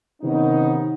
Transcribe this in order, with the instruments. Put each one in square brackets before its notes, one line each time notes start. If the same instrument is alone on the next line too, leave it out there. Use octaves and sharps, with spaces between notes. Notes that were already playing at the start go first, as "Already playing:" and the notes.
[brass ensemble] C3 D#3 B3 C#4 D#4